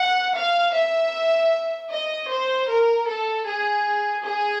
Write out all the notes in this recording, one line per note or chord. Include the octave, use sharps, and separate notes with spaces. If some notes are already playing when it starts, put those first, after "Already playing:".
Already playing: F#5
F5
E5
D#5
C5
A#4
A4
G#4
G#4